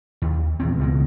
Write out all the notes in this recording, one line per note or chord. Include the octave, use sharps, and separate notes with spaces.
D#2
A#1 E2 C4
C#2 B2 F#3 G#3